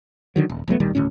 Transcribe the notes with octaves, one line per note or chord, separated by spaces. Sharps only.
D3 D#3 F#3
D#1
E1 F#3 A3 B3
D1 A#1 D#3 G3
D#1 D2 A2 C#4